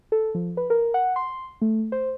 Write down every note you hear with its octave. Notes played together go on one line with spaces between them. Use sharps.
A4
F3
B4
A#4
F#5
C6
A3
C5